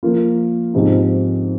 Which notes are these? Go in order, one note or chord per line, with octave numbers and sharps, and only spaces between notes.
F3 A#3 F4
G#2 F3 C4 D#4 G4